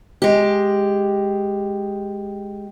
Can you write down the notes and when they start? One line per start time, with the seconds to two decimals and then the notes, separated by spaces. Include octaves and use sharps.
0.22 G#3 G4